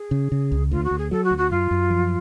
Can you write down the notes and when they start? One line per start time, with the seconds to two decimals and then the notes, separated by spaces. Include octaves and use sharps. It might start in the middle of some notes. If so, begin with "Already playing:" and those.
Already playing: G#4
0.11 C#3
0.32 C#3
0.52 C#2
0.71 D2 F4
0.84 F#4
0.91 D2
0.98 G#4
1.11 F#3 A4
1.24 F#4
1.31 D2
1.38 F#4
1.51 F#2 F4
1.71 F#2
1.90 F3